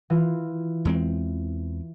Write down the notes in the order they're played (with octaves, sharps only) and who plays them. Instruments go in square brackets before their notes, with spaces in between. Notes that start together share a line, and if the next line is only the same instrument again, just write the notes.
[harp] E3 F4
[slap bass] E2 G#3 C4